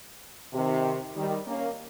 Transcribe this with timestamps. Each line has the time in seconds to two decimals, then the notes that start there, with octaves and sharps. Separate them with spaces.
0.54 C3 D#3
1.16 D#3 G3
1.46 A#3 C#4